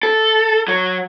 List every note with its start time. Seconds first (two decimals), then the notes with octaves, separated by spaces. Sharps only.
0.03 A4
0.68 F#3